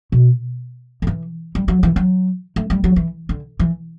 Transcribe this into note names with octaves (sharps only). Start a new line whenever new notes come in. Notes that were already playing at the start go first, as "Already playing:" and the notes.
B2
D3
E3
G3
F#3
E3
F#3
A3
G3
F#3
E3
D3
E3